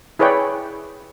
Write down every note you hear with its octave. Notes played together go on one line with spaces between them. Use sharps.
E4 G#4 B4 C#5 D5 G5